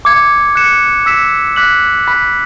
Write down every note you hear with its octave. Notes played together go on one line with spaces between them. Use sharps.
D6 G#6 C#7
F#6 C#7 E7
E6 B6 E7
D6 F#6 B6 F#7
B5 F#6 B6